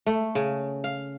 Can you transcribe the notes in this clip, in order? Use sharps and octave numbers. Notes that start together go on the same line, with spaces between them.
A3
C#3
F5